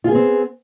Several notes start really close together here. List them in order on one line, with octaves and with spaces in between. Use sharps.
F4 G#4 B3 C4